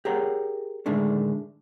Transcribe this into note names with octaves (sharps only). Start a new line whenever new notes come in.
G4 G#4 A#4 C#5 F#5
A2 D3 D#3 G#3 A3 D4